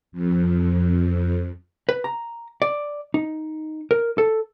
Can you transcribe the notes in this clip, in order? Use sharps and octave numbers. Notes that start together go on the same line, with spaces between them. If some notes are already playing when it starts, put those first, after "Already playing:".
F2
B4
A#5
D5
D#4
A#4
A4